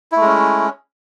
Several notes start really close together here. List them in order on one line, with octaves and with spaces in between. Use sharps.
E4 A3 G#3 C#4